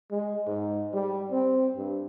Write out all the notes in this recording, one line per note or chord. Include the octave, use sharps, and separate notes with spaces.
G#3
G#2
G3
C4
G2